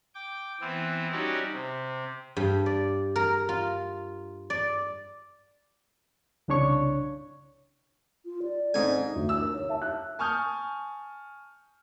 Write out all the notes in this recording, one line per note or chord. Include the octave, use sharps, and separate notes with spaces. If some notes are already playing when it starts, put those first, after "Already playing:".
G5 D6
E3 B3 C4 E4
G3 C#4 D#4 F#4 G4 D5
C3
G2
D5
A#4
F4
D5
C2 C#3 D4 C#5 C#6
F4
D5
G#2 C4 C#4 A4 G#5
D2
E6
A#4
C#5
E5 A5
F#6
G#5 A5 C#6 D#6 F6 G6